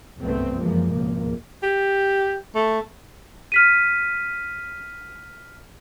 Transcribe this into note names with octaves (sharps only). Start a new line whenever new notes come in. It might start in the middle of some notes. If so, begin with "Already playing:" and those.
F#1 C2 G2 A3 B3 C4
F#1 F#2 E3 F3 G#3 A#3
G#1 C#2 B2 F3 A#3
G4
A3
F6 B6 D#7